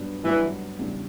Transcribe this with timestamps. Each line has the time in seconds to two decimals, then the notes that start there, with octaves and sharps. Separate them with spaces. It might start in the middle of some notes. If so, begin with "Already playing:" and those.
Already playing: G2 F#3 B3 D4
0.24 G2 E3 F#3 B3 D4
0.79 E2 C#3 G3 D4